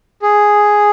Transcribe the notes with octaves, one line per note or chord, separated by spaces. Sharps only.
G#4